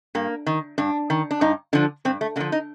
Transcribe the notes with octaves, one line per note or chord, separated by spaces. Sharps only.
G2 A#3
D#3
G2 D4
D#3
D4
G2 D#4
D3 F3 D4
G2 C4
A3
D3 F3 A#3
D#4